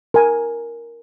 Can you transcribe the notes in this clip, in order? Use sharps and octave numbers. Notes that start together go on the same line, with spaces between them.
A#4 G#5